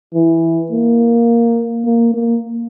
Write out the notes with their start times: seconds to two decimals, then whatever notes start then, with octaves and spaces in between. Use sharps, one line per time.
0.14 E3
0.71 A#3
1.85 A#3
2.14 A#3